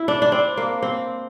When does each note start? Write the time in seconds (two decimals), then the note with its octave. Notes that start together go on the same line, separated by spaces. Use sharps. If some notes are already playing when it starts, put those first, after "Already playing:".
Already playing: E4
0.08 D4
0.22 D4
0.32 C4
0.57 A#3
0.83 C4